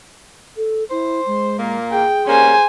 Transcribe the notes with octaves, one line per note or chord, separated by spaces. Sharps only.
A4
E4 C5
G#3
A#2 A#3
G#4 G5
G3 A#3 C#4 C5 G#5